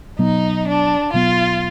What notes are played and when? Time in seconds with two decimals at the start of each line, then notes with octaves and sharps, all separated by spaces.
0.19 B2 F#3 B3 D#4
0.67 D4
1.13 B2 F#3 B3 F4